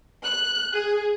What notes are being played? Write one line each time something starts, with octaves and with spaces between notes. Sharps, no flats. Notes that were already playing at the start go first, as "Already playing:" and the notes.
F#6
G#4